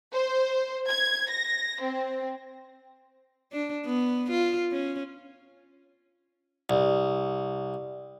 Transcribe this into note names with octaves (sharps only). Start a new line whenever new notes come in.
C5
G#6
A#6
C4
D4
B3
F4
C#4
C2